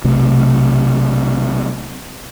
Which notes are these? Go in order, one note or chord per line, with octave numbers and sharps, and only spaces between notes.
B1 C3 A3